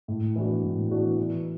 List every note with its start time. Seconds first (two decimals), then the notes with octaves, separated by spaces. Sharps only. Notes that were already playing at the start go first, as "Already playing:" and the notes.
0.08 A2
0.36 E3 B3 D4 F#4
0.63 A2
0.90 E3 B3 D4 F#4
1.17 E3